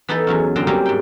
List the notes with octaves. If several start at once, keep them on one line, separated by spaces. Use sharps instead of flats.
E3 B3 D#4 E4 A4 B4
E2 F#3 C#4
F#2 D3 C5 G5 A#5
F#3 G3 A#3 C4 C#4 G4
G#2 G5